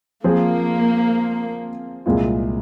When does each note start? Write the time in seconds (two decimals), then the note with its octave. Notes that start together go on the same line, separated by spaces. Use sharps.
0.24 F3 A#3 C4 F4 G#4 C5
2.06 C2 A#2 G#3 C4 F4